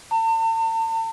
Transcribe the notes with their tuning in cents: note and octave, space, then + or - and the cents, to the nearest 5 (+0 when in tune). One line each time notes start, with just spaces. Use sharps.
A5 +40